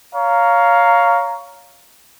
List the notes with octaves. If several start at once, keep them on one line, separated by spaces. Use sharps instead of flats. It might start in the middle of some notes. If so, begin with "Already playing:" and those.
C#5 F5 A#5